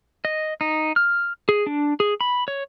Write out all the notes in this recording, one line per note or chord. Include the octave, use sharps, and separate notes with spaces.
D#5
D#4
F6
G#4
D4
G#4
B5
C#5